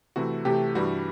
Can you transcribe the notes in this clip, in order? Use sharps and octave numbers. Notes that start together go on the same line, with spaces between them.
C3 E3 A3 C4 F#4
C3 E3 A3 C4 G4
G2 E3 G3 D4 F#4